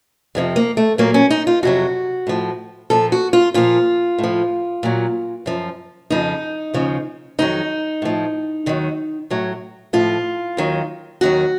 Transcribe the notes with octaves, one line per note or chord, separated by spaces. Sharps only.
F2 C3 F3
A#3
A3
A#2 F#3 A#3
C#4
D#4
F4
F2 C3 F#3 F#4
A2 F3
A#2 F3 A4
F#4
F4
A#2 F3 F4
A2
F3
A#2 F#3
F#2 F3
F2 C#3 F3 D#4
D#2 C#3 F3
F2 D#3 F#3 D#4
A2 F3
D#2 D#3 F#3
A2 F#3
A2 F3 F4
D#2 D#3 F#3
D#2 D#3 F#3 F#4